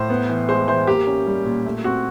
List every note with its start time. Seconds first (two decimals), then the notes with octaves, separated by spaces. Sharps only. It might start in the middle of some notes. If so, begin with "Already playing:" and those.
Already playing: A2 C5
0.09 B3
0.29 E3
0.49 G#3 C5
0.68 E3 C5
0.87 A#3 G4
1.07 C#4
1.27 G3
1.45 A#2
1.65 A3
1.84 C4 F#4